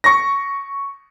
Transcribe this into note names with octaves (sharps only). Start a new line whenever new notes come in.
C#6 A#6